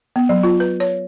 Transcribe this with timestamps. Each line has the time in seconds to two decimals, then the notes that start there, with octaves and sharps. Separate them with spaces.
0.16 B3
0.29 F#3
0.43 F4
0.60 B4
0.80 C#5